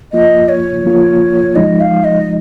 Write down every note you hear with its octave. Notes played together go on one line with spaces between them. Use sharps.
F3 A#3 F4 D#5
C#5
F3 A#3 F4
F3 G#3 D#4 D#5
F5
D#5